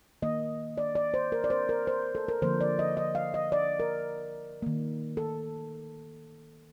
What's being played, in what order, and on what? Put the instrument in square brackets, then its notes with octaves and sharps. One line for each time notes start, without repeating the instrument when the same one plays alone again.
[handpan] D#3 A#3 D#5
D5
D5
C5
A#4
D5
C5
A#4
C5
A4
A#4
D3 F3 A#3 C5
D5
D#5
D#5
F5
D#5
D5
A#4
D#3 A#3
A4